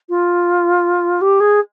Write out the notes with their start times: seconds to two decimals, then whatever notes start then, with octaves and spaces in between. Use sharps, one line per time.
0.10 F4
1.21 G4
1.40 G#4